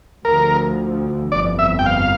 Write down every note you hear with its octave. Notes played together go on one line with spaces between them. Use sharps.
D2 D3 F3 A#4
G1 F2 E3 D5
E5
G5
F5